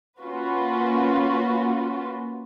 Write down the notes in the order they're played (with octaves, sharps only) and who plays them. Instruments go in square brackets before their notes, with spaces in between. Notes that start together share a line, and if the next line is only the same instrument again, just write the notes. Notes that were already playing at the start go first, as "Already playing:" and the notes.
[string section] A#3 C#4 F4 F#4 B4